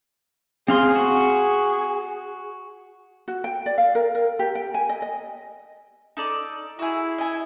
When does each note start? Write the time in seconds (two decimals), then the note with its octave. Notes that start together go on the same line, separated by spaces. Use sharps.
0.68 C4 G#4 F5 C6
0.95 F#4
3.28 F#4
3.44 G5
3.66 D5
3.78 F5
3.95 A#4
4.15 A#4
4.39 G4
4.55 G5
4.74 G#5
4.89 D#5
5.02 D#5
6.17 D#4 A4 D5
6.79 E4 F#4 G#4
7.18 D#5 G#5